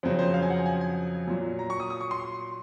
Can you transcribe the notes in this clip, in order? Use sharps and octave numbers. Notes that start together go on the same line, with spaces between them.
F2 C#3 F#3 C5
C5
F5
G#5
F#5
G#5
G#5
A#2 F#3
A#5
C#6
D#6
D#6
C#6
C6